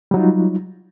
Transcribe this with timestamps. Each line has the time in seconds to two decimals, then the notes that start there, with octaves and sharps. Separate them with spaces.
0.11 G3
0.14 F#3
0.17 D#4
0.19 F4